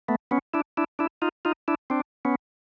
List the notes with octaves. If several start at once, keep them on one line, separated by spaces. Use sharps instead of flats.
A3 B3
B3 C#4
D4 E4
D4 E4
D4 E4
D#4 F4
D#4 F4
D4 E4
C4 D4
B3 C#4